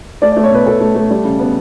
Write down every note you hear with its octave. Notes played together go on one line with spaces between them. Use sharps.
A3 D5
D5
A3
C#5
B2 B4
B2 A4
A3
A3
G3
C#3
B3